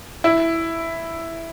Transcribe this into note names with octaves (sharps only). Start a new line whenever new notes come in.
E4